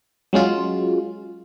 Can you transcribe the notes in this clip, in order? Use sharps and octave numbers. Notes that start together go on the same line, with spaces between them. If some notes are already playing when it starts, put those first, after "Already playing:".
F#3 G#3 C#4 F4